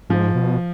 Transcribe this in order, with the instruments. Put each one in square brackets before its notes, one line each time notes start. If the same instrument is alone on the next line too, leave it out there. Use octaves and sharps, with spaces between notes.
[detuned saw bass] G#2 [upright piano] F3
[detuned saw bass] B2